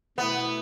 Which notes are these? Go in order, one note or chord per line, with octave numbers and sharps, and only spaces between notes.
B2 A3 B3 E4